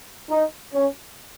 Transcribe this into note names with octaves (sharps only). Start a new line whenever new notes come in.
D#4
C#4